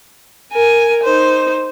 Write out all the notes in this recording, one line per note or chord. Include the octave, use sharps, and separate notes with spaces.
A#4 G#5
D#4 C5